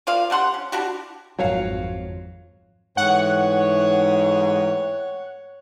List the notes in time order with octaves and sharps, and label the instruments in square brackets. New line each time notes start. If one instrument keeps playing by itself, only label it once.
[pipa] A#3 F4 D5 F5
G3 D4 F#5 C6
C#4
D4 E4 F#4 G4
[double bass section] G#1 F2 [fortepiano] F#3 C#5 F5
[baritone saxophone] G#2 [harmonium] E3 A3 G5 [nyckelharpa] C#5 [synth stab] F#5